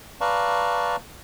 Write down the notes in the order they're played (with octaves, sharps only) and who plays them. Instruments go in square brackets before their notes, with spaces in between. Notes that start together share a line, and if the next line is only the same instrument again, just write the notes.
[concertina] B4 D5 F5 A5 A#5 C#6